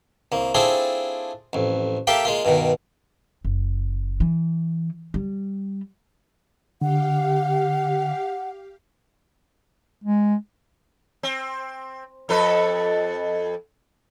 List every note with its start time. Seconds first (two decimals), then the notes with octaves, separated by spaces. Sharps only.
0.32 C2 A#3
0.55 C4 D4 E4 F4 G#4 A4
1.53 A1 F2
2.07 A#3 G4 A4 E5 F5 G5
2.25 G#3 A#3 F4
2.45 G2 B2 D#3
3.44 F#1
4.20 E3
5.14 G3
6.81 D3 G4 F5 F#5
10.04 G#3
11.23 C4
12.29 F2 A4 B4